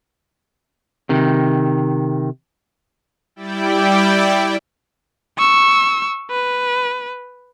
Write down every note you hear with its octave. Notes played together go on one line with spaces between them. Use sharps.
C3 D#3
G3 E4 D5 G5
C#6 E6
B4